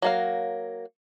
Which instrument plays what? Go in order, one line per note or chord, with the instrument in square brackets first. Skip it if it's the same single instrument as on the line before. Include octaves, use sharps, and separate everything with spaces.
[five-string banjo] F#3 A#3 F5